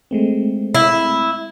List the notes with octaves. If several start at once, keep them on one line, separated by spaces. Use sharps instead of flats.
G#3 A3 C4
E4